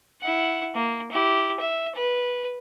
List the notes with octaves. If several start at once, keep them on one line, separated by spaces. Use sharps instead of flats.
E4 F#5
A#3
E4 G4
E5
B4